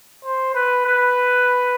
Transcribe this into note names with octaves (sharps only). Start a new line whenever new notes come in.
C5
B4
B4